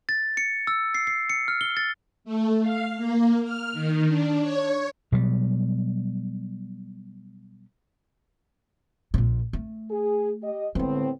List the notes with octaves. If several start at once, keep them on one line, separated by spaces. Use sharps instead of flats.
A6
C#7
E6
C7
C7
C#7
F6
G7
A6
A3
F5
A#3
F6
D#3
D4
C#5
B2 F#3 G3
A#1 A#2
A3
G#4
G4 D#5
A2 D3 G#3 B3 C4